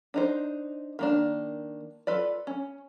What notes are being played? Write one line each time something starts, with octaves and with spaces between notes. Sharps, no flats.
D4 D#4 C5
D#3 A#3 D4
F4 A4 B4 D5
C#4